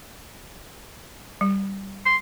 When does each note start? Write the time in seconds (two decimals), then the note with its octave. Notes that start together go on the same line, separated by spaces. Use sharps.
1.41 G3
2.06 C6